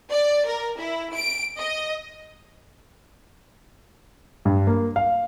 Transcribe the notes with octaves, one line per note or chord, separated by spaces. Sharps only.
D5
A#4
E4
D7
D#5
G2
A#3
F5